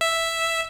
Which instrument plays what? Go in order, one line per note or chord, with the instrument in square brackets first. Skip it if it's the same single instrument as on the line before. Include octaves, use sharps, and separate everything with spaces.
[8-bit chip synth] E5